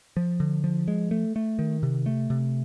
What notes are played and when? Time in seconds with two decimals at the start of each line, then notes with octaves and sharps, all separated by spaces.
0.17 F3
0.40 D3
0.64 F3
0.88 G#3
1.11 A3
1.36 A3
1.59 D#3
1.83 C3
2.06 A3
2.30 C3